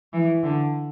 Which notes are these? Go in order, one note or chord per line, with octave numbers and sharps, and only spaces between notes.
E3
D3